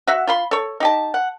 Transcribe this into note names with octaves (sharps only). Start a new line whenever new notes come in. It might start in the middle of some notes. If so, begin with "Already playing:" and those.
F#4 E5 F#5
F4 B5 C6
A4 C#5
D#4 G4 A5
F#5